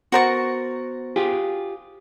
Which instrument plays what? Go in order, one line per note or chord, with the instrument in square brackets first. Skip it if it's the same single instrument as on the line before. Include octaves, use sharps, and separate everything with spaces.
[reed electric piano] B3 C5 A6 [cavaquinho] F#4 A#4 C#6
[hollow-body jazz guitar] F4 G4 G#4